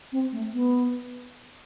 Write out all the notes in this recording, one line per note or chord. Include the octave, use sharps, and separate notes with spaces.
C4
A3
B3